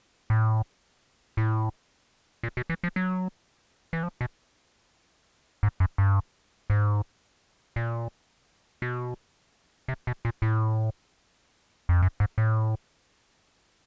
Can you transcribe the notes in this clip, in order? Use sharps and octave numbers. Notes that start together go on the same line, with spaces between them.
A2
A2
A#2
B2
E3
F3
F#3
E3
F3
B2
G#2
F#2
G2
G#2
A#2
B2
C3
B2
A#2
A2
F2
F#2
G#2
A2